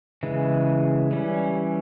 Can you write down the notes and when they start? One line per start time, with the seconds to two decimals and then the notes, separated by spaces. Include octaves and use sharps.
0.23 C#3 E3 G#3
1.11 E3 G3 C#4